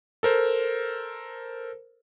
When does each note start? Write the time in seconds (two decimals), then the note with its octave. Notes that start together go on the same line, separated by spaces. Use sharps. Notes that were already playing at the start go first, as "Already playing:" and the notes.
0.23 A4 A#4 C5